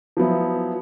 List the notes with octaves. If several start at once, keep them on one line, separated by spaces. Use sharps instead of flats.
F3 F#3 B3 E4